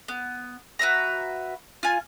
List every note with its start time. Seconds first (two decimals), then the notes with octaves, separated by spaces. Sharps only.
0.08 B3
0.79 F#4 B4 E5 A#5
1.83 F4 G#5